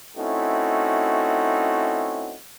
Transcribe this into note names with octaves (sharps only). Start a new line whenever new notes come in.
A3 C4 C#4 D#4 E4 F#4